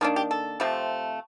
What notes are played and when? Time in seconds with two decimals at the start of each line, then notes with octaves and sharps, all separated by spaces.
0.01 D#3 A#3 D4 A4
0.16 G4
0.31 A4
0.60 C3 F3 A3 C4